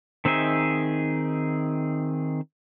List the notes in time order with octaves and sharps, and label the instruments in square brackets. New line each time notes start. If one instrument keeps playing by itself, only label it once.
[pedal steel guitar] D#3 C4 D#4 G#4 E5